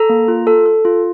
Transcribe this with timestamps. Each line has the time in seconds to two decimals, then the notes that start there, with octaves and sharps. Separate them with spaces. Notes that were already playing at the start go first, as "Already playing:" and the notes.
Already playing: A4 A#5
0.09 A#3
0.28 F4
0.47 A4
0.66 A4
0.85 F4